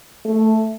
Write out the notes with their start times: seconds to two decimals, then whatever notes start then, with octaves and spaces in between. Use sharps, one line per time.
0.25 A3